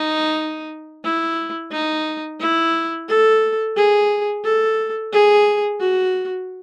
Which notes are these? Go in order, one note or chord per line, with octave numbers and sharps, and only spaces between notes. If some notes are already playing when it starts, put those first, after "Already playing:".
Already playing: D#4
E4
D#4
E4
A4
G#4
A4
G#4
F#4